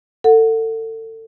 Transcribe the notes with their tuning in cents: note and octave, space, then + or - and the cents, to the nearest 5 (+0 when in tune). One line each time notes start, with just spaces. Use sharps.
A4 +30 F#5 -10